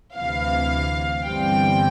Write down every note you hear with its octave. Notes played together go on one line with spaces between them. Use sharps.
D2 C3 E3 F5
G1 G2 E3 G3 C4 G5